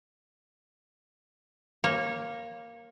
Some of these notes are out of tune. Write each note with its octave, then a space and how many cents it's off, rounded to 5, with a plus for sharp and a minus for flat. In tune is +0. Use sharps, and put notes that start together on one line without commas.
A#3 +0 C#5 -25